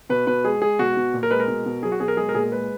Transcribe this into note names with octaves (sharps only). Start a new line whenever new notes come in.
B2 B4
B2 B4
G#3 G#4
G#3 G#4
B2 F#4
B2
A#2
A#4
G#3 B4
A#4
B2
B2
F#3 G#4
F#4
B2 G#4
A#4
G#3 G#4
A#4
A#2 G#4
A#4
G#3 B4